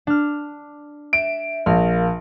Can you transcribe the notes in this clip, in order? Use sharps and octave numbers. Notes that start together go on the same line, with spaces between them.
D4 F6
E5 D7
A#1 A#4 F5